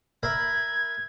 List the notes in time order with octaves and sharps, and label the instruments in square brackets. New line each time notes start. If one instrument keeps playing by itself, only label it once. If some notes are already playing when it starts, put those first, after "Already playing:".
[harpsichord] A#4 E5 B5 [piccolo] G#6